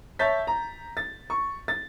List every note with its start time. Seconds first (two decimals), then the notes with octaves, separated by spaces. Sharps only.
0.19 C#5 E5 A5 G6 A6 B6
0.47 A#5
0.97 A6
1.30 C#6
1.68 A6